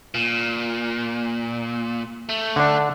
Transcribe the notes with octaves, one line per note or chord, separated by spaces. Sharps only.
A#2
A3
D3 D4